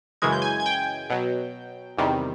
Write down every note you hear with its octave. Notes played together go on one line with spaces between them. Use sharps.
F#2 C#3 E3 G#3 G#6
G6
G#5 G#6
G#6
G5 G6
B2 F#3
E2 C3 D#3 G3